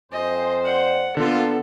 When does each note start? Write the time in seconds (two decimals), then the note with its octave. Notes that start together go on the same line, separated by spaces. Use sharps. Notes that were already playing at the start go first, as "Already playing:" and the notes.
0.12 F2 C5 D#5 G#5
0.65 D5 F#5
1.17 D3 A#3 B3 F4 A4